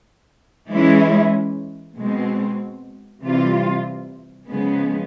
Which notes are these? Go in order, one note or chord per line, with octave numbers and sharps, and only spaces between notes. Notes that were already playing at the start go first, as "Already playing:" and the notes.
E3 G#3 C#4 E4
B2 G#3 C4
C3 E3 G3 C4 F4
C#3 F3 G#3 B3